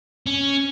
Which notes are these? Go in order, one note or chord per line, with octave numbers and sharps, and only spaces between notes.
C#4